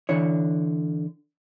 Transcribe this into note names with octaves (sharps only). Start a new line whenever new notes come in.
D3 E3 C#5